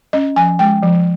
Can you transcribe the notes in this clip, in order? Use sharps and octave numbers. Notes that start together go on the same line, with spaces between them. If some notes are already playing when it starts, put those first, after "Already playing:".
C#4 D#5
F3 G#5
G#3 G5
F3